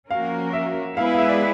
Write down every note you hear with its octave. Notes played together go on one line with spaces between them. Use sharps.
F3 A#3 C#4 F#4 A#4 F5
E5
G#3 B3 E4 G#4 B4 F5
F5
E5
D5